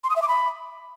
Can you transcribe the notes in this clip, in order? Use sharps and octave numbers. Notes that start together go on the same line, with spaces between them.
C6
D#6
E5
D6
B5